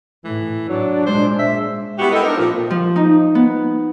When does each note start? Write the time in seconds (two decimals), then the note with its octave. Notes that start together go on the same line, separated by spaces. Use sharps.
0.24 A2 E3
0.69 F#3 D4
1.06 A#2 G#3 C5
1.39 E5
1.98 G3 B3 E4 F#4 G4
2.12 B3 C4 E4 A4 A#4 D#5
2.24 D4 D#4 A#4
2.37 A#2 F3
2.70 F3
2.96 D#4
3.35 B3